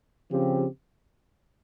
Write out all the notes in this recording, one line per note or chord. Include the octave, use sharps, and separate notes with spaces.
C#3 F3 C4 G4